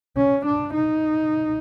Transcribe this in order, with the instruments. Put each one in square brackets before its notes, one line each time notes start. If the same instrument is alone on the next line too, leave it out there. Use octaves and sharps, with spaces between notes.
[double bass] C#4
D4
D#4